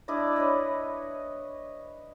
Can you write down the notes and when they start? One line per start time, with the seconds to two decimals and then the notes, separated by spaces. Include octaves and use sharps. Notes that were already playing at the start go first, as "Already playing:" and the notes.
0.08 D4 E4 D5 D#5
0.36 B4 C#5 D#5